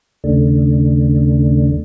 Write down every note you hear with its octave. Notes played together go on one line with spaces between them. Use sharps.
D#2 C#3 A3 D4